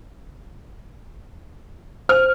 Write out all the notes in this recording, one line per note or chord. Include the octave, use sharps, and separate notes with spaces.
C5 F6